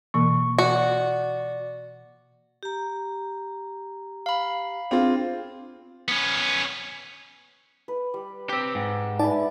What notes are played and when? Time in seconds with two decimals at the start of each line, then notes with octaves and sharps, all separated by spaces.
0.14 B2 E3 A#3 C#6
0.59 F#4 D5
2.63 G4 A#5
4.26 F5 B5
4.91 C4 D4 F4 G#4
6.08 B3 C#4
7.88 B4
8.14 G3
8.49 C4 G4
8.75 G#2
9.19 D#4 B4 D5 E5 G#5 A5